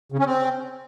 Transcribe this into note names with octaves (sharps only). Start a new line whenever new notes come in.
C#3
C#4
C4